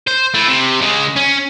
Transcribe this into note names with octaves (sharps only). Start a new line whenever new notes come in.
C5
A3 E4
C3
C#3 G#3
C#4